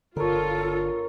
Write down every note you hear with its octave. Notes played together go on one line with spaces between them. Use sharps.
G1 D3 F4 A4 A#4 C#5